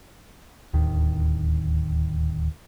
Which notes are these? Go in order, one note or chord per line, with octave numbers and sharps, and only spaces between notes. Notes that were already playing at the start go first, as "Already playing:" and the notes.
D1 D#2 D#3